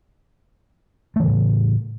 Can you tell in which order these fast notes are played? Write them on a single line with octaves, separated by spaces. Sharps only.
A3 E3 C#3 A2